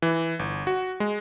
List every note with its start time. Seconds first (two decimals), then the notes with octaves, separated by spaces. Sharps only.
0.02 E3
0.39 G1
0.67 F#4
1.00 G#3